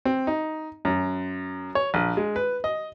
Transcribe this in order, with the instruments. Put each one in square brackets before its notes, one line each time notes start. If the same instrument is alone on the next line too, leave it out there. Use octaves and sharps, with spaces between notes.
[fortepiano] C4
D#4
F#2
C#5
A#1
G#3
B4
D#5